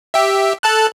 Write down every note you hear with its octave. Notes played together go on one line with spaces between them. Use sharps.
G4 E5
A4 A5 F#6